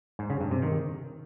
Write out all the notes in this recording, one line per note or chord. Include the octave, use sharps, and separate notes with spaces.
G#2
C#3
G2
C3
D#3